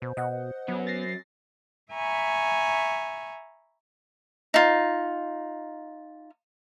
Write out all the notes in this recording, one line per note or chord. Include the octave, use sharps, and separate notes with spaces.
B2 C5
B2 D#5 F#5
F#3 B3 C#4
A6 A#6 C7
E5 G#5 A#5 B5 C#6
D#4 F4